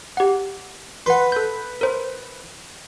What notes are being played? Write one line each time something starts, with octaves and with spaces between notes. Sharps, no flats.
G4 F#5
B4 F#5 C6
A4 G6
A#4 C5